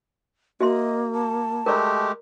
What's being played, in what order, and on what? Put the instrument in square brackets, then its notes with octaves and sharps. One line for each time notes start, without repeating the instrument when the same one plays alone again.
[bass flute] A#3 [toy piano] F#4 E5 C6 [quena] D#5
[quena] A5
[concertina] G#3 A3 G4 [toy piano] A#4 D5 A#5